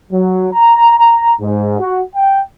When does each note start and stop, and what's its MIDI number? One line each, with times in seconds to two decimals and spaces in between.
0.11 0.48 54
0.53 0.95 82
0.97 1.33 82
1.40 1.79 44
1.79 2.01 66
2.15 2.40 79